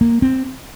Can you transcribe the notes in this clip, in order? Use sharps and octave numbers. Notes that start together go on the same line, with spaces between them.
A#3
C4